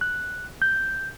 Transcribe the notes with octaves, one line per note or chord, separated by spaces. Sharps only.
F#6
G6